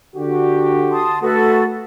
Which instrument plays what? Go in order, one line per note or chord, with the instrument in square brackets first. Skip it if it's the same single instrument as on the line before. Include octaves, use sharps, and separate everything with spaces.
[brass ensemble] D3 F#4 G4
[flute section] A5 C6 D#6
[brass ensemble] A3 F#4 [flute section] A4 B4